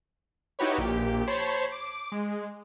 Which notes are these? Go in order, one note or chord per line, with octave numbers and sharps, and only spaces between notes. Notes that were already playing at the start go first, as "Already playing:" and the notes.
D#4 E4 F#4 G4 B4 C#5
A#1 A#2 G4
C5 C#5 A5 B5 C7
D6
G#3